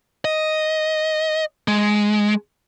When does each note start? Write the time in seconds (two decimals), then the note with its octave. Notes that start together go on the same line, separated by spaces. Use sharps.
0.25 D#5
1.68 G#3